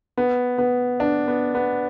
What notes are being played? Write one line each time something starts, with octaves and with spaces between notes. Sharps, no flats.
B3
B3
D4
B3
B3